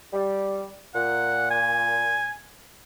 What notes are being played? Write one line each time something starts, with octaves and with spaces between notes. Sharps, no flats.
G3
A#2 F#5
G#5